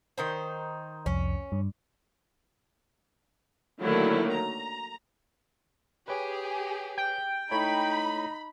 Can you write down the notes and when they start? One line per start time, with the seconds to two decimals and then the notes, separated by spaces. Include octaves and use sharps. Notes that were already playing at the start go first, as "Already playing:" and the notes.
0.18 D#3 D#4 C5
1.06 C2 F2 C#4
1.52 G2
3.83 D3 D#3 F#3 A3 A#3 E4
4.33 A#5
6.08 G4 G#4 B4 C#5
6.98 G5
7.51 A3 D#4 E4 C#5 B5